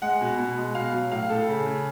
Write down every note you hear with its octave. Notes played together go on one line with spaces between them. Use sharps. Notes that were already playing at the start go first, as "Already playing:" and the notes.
G#3 F#5
B2
B2
G#3
B2 F5
F#3
A2 F5
A2 A4
C#3
C#3